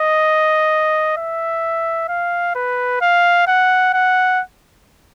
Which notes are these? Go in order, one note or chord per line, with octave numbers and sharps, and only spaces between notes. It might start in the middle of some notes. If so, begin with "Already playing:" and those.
Already playing: D#5
E5
F5
B4
F5
F#5
F#5